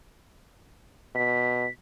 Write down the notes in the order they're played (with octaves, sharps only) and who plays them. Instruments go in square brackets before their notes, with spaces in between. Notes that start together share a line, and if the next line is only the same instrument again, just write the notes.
[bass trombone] B2 [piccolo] B6